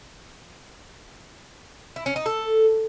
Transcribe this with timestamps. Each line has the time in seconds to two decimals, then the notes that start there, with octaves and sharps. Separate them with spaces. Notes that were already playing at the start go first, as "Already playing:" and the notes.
1.96 E4
2.06 C#4
2.16 D#4
2.26 A4